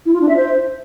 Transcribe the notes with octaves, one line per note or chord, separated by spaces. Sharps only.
E4
F4
D4
E5
C5